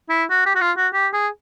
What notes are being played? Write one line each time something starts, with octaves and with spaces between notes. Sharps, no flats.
E4
F#4
G4
F#4
F4
F#4
G4
G#4